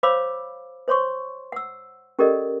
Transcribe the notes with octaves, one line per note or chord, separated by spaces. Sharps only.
C5 C#5 F5 B5 D6 E6
C5 C#5 C6 C#6
F#5 E6
C#4 G4 A4 A#4 D5 D#5